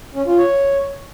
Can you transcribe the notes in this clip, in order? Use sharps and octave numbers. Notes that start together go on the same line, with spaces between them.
C#4
F4
C#5